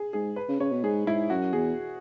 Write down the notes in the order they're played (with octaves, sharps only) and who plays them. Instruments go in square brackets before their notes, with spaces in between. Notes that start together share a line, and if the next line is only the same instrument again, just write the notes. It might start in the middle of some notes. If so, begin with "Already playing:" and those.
Already playing: [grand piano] G#4
[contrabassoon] G#2 [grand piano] G#4
[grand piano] B4
[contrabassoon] C#3
[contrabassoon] C#3 [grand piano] C#5
[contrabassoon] B2
[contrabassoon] G#2 [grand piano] G#4
[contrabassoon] G#2 [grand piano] E4
[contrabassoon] F#2 [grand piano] F#4
[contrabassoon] E2 [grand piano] G#4